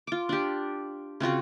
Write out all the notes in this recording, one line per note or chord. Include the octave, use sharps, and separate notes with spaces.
F4 D6
D4 G4
C#3 C4 F4 F#4